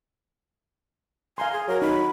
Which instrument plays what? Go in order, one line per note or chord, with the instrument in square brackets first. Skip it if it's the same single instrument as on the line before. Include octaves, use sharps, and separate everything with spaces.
[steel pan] F5 A#5 C6 [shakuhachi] G#5
[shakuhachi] G#4
[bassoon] F#3 [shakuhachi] A#4
[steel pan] D#4 [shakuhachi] B5